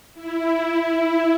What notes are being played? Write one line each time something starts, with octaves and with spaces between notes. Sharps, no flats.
E4